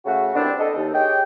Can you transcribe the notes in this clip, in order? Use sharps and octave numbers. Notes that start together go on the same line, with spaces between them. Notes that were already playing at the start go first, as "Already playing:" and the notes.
C#3 A3 F#4
C2 B3 C4 D4
A4 D#5
D#2
G4 G#4 C#5 D#5 G5